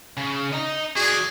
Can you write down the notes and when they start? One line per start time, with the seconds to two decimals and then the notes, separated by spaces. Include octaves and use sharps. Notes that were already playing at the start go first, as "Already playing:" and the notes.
0.17 C#3
0.52 D#5 A#5
0.96 F#4 G#4 D5